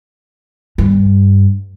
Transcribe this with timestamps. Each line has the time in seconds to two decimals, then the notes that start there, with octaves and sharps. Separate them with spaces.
0.78 G2